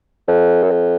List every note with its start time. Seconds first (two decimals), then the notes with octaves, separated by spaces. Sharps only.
0.28 F2
0.63 F#2
0.71 F2